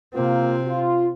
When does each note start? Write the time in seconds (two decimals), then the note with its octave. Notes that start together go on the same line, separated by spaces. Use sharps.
0.14 C3 A#3 C4 F4
0.66 F4